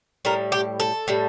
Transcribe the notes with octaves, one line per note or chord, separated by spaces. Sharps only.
A2 G3 A#4
G4
A4
A2 G3